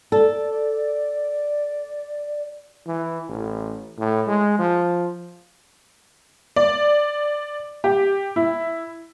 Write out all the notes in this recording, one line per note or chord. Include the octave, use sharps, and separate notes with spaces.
A4 D5
E3
A1
A2
G#3
F3
D5
G4
E4